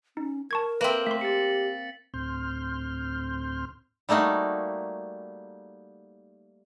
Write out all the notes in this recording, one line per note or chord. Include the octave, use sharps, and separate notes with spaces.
C#4 D#4
A#4 A5 C#6 G#6
A#3 C4 B4 E5 A#6 F#7
A3 C6 B6
G4 A6 C#7
D2 A2 C4 C6 F6 G6
G3 A3 A#3 D#4 F#4